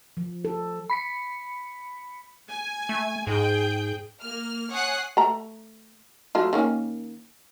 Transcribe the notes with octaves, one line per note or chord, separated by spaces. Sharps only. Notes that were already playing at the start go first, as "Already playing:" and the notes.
F3
A4
B5 B6 C#7
G#5
A3
G#2 G#4 G5
A#3 F6
C#5 F#5 G#5 D#6 F#6 C7
A3 A#5
F#3 A3 F4
D#3 A#3 C#4